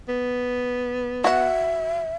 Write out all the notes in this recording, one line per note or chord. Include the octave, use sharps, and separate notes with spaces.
B3
F#4 E5 F#5